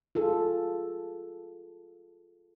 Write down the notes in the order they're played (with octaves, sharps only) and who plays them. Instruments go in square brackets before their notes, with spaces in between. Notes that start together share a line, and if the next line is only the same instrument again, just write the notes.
[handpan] F4 G#4 A4